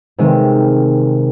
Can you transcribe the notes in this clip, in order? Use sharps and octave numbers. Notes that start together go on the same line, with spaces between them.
C3 D#3 G#3